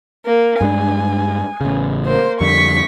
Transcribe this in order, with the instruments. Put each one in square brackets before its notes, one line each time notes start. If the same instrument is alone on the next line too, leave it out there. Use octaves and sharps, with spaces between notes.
[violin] A#3
[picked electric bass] G2 G#3 D4 [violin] G#5
[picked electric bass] A1 C#3
[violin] A#3 C5
[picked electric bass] F2 D3 G3 [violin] C#6 B6